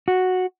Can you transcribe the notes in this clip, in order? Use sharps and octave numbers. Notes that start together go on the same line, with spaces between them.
F#4